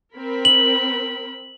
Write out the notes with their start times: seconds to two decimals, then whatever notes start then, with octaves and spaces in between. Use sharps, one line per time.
0.14 C4 A#4 B5
0.45 F#7